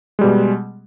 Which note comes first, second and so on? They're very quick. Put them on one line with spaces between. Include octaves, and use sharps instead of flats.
G#3 G3 B2